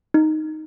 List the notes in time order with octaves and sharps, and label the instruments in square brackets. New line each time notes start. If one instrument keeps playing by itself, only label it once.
[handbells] D#4